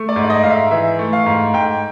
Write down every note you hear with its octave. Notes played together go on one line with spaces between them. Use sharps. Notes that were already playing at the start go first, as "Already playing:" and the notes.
Already playing: A3
D5
G#2
D5
D#5
G#2 F5
E5
E3 E5
A3
F5
G#2
G#2 G5